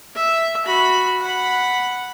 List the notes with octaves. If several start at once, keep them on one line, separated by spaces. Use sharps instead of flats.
E5
F#4 B5
F#5 B5